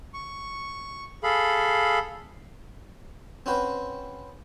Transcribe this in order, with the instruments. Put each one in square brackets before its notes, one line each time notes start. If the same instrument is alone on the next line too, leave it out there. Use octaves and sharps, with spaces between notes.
[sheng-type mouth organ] C#6
G#4 A4 F5 B5
[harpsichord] C4 C#4 F#4 B4 C5